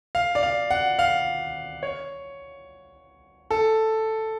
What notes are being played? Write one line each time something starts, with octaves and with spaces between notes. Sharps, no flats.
F5
D5
F5
F#5
F5
C#5
A4